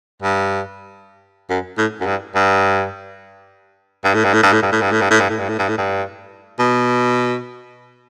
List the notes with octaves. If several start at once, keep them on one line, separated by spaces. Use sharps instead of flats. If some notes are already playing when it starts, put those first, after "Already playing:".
G2
F#2
A2
F#2
G2
G2
G2
A2
G2
A2
G2
A2
G2
A2
G2
A2
G2
A2
G2
A2
G2
A2
G2
A2
G2
B2